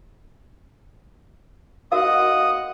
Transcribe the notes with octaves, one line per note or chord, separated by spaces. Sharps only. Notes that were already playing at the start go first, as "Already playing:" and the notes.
F#4 A#4 D#5 F5 F#5 D#6